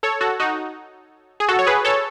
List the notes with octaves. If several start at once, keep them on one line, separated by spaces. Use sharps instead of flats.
A4 C#5
F#4 A4
D#4 F#4
G#4
F#4 A4
C#5
G#4 B4
A4 C#5